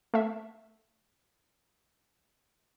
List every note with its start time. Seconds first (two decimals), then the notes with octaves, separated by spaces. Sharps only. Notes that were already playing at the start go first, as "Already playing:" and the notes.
0.14 A3 E5